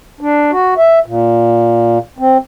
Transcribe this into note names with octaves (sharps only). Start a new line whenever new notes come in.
D4
F#4
E5
A#2
C4